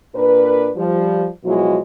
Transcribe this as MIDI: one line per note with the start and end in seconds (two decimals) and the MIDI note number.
0.15 0.70 46
0.15 0.70 62
0.15 0.70 70
0.15 0.70 71
0.76 1.27 53
0.76 1.27 55
1.45 1.78 47
1.45 1.78 53
1.45 1.78 54
1.45 1.78 56
1.45 1.78 64
1.45 1.78 66